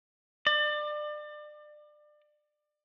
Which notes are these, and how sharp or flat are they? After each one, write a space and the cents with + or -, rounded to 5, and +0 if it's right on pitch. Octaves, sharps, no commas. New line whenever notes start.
D5 +30